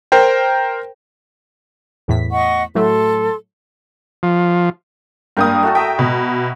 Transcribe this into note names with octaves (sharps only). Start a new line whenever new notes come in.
A#4 C5 G5
E2 A2 B6
D#5 F#5 C#6
A2 F#3 A3 A4 C6
F3
G2 A#3 A#4 G5 D#6
A3 F#4 A4
E5 G5 A#5 D#6
B2